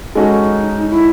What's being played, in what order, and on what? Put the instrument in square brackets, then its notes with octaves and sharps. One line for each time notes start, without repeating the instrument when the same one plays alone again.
[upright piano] G#3 C#4 F#4 A4 [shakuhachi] D#4
[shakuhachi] E4